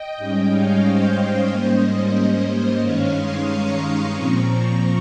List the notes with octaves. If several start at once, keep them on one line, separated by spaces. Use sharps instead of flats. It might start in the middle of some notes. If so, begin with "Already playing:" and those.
Already playing: D#5 G5
G#2 G3 C#4
C#5 F5
C5 D#5
C#5 F5
G#2 G3 A#3 C#4 C5 D#5
C5 D#5
G2 D#3 G#3 C#4 C#5 F5
C6 D#6
A#5 C#6
A#2 F3 C4
A#5 C#6